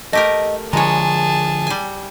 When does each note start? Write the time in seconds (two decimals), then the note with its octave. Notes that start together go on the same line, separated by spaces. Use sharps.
0.13 A3 G4 A#4 D#5
0.73 D3 F3 G#3 G#4 C#5 A5 A#5
1.67 G3 G#5